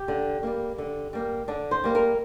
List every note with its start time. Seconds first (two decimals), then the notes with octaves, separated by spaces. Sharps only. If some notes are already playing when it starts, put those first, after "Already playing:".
Already playing: G4
0.08 D3
0.43 G3 A#3
0.78 D3
1.13 G3 A#3
1.48 D3 D4
1.71 C5
1.84 G3 A#3
1.95 A#4